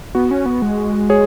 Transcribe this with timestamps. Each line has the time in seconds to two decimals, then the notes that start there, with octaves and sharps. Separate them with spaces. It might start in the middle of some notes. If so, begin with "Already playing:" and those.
0.15 B3 F#4
0.31 C#4
0.46 B3
0.62 G#3
1.10 G#4 C#5